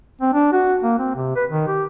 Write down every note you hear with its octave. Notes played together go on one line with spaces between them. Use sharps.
C4
D4
F#4
A#3
C4
C3
B4
D#3
G4